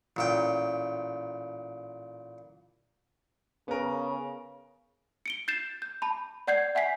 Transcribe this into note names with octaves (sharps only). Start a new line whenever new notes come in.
A1 A#2 G5
C#3 B3 A#4
C#7 D7 G7
G6 A6 C7 E7
G6
A5 B5
D5 F#5 G6 G#6 C7
E5 F#5 G#5 B6 C7